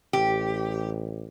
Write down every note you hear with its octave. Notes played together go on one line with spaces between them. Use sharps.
A1 G4